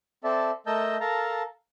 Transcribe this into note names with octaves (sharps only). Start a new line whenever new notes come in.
C4 A4 D5 E5 A5
A3 A#4 D#5 A5 E6 G6
A4 A#4 F5 A5 A#5